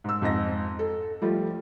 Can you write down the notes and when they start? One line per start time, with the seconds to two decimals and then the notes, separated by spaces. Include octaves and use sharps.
0.04 G#2 E6
0.22 F2 G#2 D#5 A#6
0.79 A4
1.22 F3 G3 A3 F4